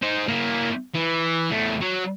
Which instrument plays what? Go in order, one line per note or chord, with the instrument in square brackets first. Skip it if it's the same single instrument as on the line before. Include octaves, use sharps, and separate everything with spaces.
[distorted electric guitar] D#4 C5
A#3 E4
E3
E2 A3
F#3